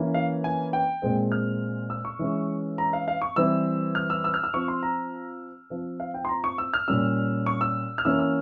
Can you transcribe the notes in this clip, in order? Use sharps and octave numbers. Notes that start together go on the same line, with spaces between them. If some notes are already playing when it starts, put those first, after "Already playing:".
Already playing: E3 A#3 C#4
F5
G#5
G5
A#2 G#3 C4
F6
E6
C#6
E3 G#3 C#4
A#5
F5
F5
C#6
E3 G3 C4 E6
F6
E6
E6
F6
E6
F3 C4 C#6
C6
A#5
F3 C4
F5
G5
C6
A#5
C#6
E6
F6
A#2 G3 C#4 E6
C#6
E6
F6
E3 A#3 C#4 E6
E6